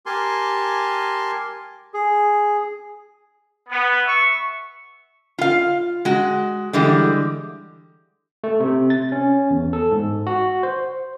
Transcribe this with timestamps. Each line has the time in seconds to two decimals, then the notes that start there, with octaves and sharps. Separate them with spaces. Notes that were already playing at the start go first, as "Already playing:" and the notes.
0.06 G4 A#4 G#5 A5 C6
1.94 G#4
3.69 B3
4.05 E5 C#6
5.38 F4 F5
6.05 G#3 F#4
6.73 D3 E3 G3 G#3
8.44 A3
8.60 C3
8.90 A6
9.12 C#4
9.51 E2
9.73 A4
9.91 G#2
10.27 F#4
10.63 C5